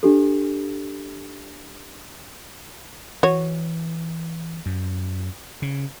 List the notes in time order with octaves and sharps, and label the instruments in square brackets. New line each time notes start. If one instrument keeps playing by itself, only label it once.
[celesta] D4 G4 A4
[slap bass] E3 [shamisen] F#4 C#5
[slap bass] F#2
C#3